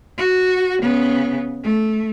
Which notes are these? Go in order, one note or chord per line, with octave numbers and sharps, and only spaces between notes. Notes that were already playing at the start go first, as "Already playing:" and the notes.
F#4
C#3 B3
A3